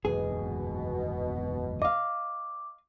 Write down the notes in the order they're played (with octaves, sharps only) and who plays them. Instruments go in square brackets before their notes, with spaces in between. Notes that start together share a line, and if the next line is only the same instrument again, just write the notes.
[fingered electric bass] F#1 E2 G#2 [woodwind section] B2 [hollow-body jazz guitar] G#4
[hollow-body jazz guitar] D#5 F5 [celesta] D6